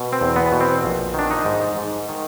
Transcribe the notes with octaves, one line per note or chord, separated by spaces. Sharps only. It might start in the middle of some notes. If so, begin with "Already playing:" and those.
Already playing: B2
C4
E2
B3
B2
C4
A#1
D#3 D4
D#4
G#2
G#2
D#3